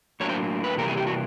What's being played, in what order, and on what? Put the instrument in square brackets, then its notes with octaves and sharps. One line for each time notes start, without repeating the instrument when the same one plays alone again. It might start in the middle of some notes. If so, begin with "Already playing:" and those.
[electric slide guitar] A2 F#3 A#3 D4 C#5
C5
B4
C3 E3 G3 A#3 A#4
G#4
G4
F#4